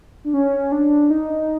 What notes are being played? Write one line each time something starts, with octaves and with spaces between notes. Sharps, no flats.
D4
C#4
D4
D#4